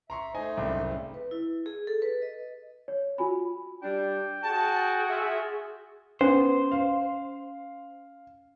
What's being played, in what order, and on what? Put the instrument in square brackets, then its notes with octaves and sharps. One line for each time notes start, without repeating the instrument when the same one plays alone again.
[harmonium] E5 [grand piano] A#5 C6 C#6
[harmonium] A3 D#4 C5 [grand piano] D#5 G#5
[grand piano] F#1 C2
[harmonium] C#3 A3
[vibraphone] B4
E4
G#4
A4
B4
D#5
[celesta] C#5
F4 F#4 G#5 B5
[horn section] G3 D4 [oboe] G5
[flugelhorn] F#4 [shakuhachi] G#4 [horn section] A5
[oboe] F4 [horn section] E5
[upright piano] B3 [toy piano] C#4 [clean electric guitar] C5
[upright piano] F5